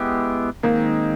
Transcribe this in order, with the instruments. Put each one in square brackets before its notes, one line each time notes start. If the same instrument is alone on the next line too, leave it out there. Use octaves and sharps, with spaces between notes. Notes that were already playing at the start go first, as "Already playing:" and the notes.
Already playing: [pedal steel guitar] G#3 B3 E4 G4
[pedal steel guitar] D#3 G#3 C4 D#4 [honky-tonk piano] A#3